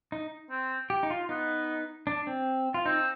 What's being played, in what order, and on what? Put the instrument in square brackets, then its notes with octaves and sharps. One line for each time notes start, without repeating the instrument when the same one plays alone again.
[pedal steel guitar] D#4
[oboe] C4
[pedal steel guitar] G4
D#4
F4
[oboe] B3 [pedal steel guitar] D#4
[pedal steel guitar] D4
C4
F4
[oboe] C4 [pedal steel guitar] D#4